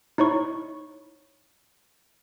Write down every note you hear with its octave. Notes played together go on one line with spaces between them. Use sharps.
D#4 E4 C#5 C#6